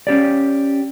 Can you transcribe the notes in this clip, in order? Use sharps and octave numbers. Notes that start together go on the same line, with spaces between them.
C#4 G4 D5